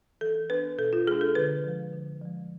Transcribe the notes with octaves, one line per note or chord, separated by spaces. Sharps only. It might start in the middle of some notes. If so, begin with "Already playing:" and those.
E3 A4
B3 D4 B4
B2 A4
F4
G#3 D4 G#4
A4
D3 B4
F3 G#3
D3
F3 G#3